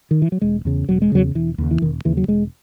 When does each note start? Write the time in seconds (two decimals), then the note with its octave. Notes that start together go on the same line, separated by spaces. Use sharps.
0.11 D#3
0.22 E3
0.32 F#3
0.41 E1 G#3
0.65 E2 C#3
0.89 E1 F#3
1.02 G#3
1.12 E2 C#3 F#3
1.35 E1 E3
1.58 D#2 C#3
1.71 E3
1.82 E1 D#3
2.05 D#2 C#3 E3
2.17 F#3
2.28 E1 G#3